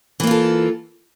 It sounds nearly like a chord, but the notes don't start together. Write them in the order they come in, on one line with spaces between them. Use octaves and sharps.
E3 A#3 F4 A4